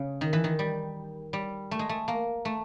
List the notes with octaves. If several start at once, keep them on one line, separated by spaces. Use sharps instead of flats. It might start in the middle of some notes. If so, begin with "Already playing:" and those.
Already playing: C#3
D#3
E3
D#3
G3
G3
A3
G#3
A3
A#3
A3